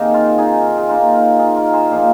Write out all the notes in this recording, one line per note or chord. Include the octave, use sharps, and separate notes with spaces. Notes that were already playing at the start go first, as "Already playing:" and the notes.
Already playing: C3 D#3 A#3 C4 D#4 G#4 A#4
F4
D#4 G#4
A#4
G#4
D#3 A#3 D#4 F4
F4
D#4 G#4
F4 A#4
G#4 C5
A#2 F3 A#3 D#4